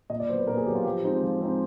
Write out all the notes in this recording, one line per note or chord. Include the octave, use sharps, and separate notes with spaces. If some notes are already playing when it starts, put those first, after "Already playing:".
A#2 D#5
D5
F#3 B3 C5
B4
A#2 A#4
G#4
F#3 B3 G4
F4
F3 G4
G#3 C4 D#4
F3
G#3 C4 D#4